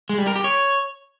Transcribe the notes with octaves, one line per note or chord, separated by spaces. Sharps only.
G#3
G3
A#4
G4
C#5